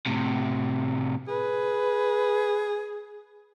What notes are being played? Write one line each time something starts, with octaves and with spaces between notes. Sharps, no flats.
A2 C3
G#4 B4